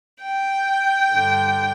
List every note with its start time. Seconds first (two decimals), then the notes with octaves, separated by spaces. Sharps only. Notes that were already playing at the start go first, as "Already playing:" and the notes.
0.23 G5
1.12 G2 D3